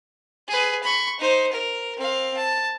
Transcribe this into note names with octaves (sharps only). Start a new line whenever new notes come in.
G#4 B4
B5 C#6
D#4 C5
A#4
C4 F5
A5